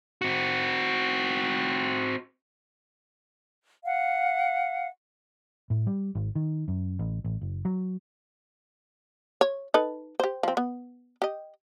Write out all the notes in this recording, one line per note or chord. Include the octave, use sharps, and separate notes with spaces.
C4 F#4
F5 F#5
A2
G3
G#1
D#3
F#2
A1
A1
F#1
F#3
C#5
D#4 A4 B4
G4 C5
F3 C4
B3
G4 D#5